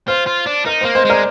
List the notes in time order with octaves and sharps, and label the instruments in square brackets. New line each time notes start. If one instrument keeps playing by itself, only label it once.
[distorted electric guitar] F4 [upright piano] C5
[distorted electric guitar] F4
D4
[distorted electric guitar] D#4 [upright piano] A#4
[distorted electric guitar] A#3 [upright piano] C5
[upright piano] C5 D#5
[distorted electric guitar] G#3 [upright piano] A#4 D5